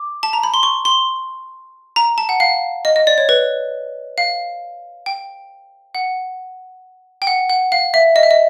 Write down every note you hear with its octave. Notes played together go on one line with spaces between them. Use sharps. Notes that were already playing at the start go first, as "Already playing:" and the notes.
Already playing: D6
A5
A#5
B5
C6
C#6
C6
A#5
A5
F#5
F5
D#5
D#5
D5
C#5
B4
F5
G5
F#5
G5
F#5
F#5
F5
E5
D#5
E5
D#5